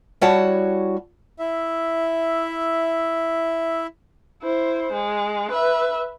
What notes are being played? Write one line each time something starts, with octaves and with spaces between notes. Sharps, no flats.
G3 E4 F#4 C#5 F#5 A5
E4 E5
E4 C5
G#3
B4 E5